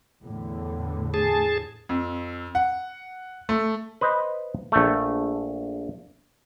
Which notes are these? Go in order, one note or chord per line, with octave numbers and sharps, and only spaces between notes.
E2 A2 D3
G#4 A5
F2
F#5
A3
B4 C5 D#5
A#1 A3